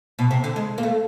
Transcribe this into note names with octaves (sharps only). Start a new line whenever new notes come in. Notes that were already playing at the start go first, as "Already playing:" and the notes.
B2
C3
D3
G#3
A#3
A3